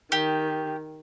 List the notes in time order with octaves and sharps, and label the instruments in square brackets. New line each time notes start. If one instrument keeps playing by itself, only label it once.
[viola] D#3 [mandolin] G4